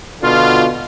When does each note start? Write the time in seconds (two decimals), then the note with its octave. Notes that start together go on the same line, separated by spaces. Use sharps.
0.22 B2 D3 F4